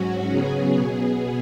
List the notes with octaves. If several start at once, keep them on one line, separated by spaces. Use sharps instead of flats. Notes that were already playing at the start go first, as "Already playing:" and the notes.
Already playing: G#2 F#3 C#4 F#4
C#3 F#3 B3 G#4
B2 B3